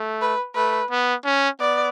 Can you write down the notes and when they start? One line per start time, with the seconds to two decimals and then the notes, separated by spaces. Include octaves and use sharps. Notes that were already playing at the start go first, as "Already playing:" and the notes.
Already playing: A3
0.21 B4
0.55 A3 B4
0.91 B3
1.25 C#4
1.60 B3 D5